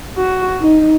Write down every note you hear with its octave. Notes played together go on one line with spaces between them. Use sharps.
F#4
D#4